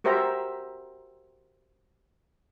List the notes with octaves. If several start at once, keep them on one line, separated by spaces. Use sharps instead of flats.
F#4 G4 A#4 C5 E5 A#5